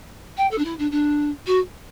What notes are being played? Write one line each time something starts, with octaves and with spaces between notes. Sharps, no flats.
G5
A4
D4
E4
D4
D4
F#4